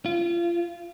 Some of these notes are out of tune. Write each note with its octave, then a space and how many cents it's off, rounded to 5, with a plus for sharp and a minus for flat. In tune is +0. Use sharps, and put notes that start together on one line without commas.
F4 -30